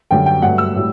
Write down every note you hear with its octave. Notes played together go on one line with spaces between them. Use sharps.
F#2 D3 G3 G5
G5
G2 F#3 A3 F#5
E6
A2 G3